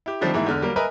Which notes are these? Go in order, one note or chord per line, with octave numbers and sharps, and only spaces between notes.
E4 G4
D3 D#3 F3 G3 A3 C4
G#2 E3 A#3 E4
E2 D3 F6
F#3 G3 A#3 A#4
A#4 B4 D#5 E5 G#5